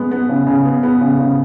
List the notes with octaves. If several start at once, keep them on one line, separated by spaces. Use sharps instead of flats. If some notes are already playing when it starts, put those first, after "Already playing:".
Already playing: G#3 B3
B3
C#3
C#3
B3
B3
C#3
C#3